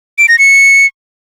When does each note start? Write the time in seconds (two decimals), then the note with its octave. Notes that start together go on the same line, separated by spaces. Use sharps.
0.18 D7
0.29 A#6
0.39 C#7